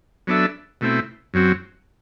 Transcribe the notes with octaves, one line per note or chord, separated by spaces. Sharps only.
F#3 B3 D4 A4 E5
B2 A3 C4 E4
F#2 F#3 C4 F#4